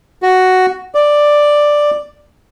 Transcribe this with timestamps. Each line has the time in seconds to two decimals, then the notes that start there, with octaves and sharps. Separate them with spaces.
0.22 F#4
0.95 D5